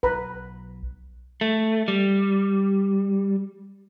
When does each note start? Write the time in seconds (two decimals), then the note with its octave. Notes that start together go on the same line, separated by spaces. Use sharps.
0.03 B1 B4 A#5 B5
1.41 A3
1.88 G3